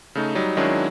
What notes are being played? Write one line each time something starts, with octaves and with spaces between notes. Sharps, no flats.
C#3 A3 D#4
F#3 G3 D#4
D#3 F#3 G#3 C#4 D4 E4